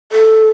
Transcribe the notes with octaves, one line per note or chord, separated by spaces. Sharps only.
A4